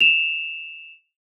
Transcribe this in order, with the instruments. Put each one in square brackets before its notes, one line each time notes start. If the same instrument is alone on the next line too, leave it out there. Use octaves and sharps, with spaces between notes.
[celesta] E7 F7